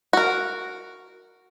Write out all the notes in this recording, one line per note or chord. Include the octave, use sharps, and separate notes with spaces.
F#4 A#4